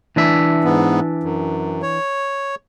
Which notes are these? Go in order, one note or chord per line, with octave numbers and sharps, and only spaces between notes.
E3 D4 E5
G#2 B3
F#2
C#5